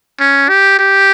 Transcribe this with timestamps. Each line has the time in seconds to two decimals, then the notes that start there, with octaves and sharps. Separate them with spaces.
0.20 C#4
0.49 G4
0.79 G4